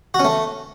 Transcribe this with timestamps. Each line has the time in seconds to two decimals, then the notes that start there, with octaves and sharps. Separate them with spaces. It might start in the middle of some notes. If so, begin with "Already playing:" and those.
0.14 F#4
0.19 C#4
0.25 A3